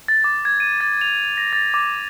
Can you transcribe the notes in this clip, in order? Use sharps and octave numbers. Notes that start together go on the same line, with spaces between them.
A6
D6
G#6
D#7
A6
F7
A#6
A6
D6